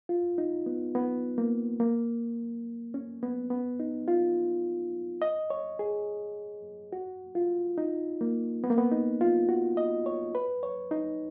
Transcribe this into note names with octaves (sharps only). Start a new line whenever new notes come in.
F4
D#4
B3
B3
A#3
A#3
C#4
B3
B3
D#4
F4
D#5
C#5
G#4
F#4
F4
D#4
A#3
B3
A#3
B3
D#4
F4
F#4
D#5
C#5
B4
C#5
D#4